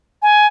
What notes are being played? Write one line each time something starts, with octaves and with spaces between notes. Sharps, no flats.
G#5